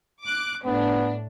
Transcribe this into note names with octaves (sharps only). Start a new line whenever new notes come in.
D6 F#6
A2 B3 D4